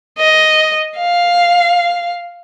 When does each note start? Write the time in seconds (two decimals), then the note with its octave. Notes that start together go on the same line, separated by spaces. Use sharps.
0.18 D#5
0.98 F5